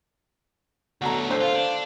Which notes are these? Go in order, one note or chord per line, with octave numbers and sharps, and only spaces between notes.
D2 F#3 B3 F#4 A4 A#5
D3 A3 C5
F4 F5
D4